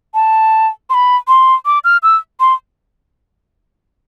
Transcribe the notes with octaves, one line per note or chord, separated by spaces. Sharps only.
A5
C6
B5
C6
D6
F6
E6
C6